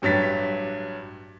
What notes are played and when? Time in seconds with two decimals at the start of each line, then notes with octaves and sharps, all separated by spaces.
0.02 A1 G2 F#3 A6 B6